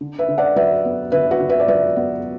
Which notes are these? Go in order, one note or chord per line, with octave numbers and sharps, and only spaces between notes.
D3
B4 E5
D3
D5 F#5
F#3 B4 E5
B3
D3 B4 E5
F#4 B4
D3
B4 E5
D5
F#3 B4 E5
B3